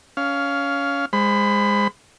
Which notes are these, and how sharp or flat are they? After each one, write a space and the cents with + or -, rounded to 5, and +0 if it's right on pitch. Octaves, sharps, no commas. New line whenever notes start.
C#4 +20 F5 +0
G#3 -20 C5 +0 B5 +20